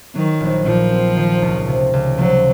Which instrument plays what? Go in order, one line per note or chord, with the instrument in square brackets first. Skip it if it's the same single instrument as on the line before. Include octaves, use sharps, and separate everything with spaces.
[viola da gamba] D#3 [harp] F#3
[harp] A#1
[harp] A#2 [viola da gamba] F3
[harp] C4
D#3
C#2
C3
C#2
[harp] F3 [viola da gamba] F#3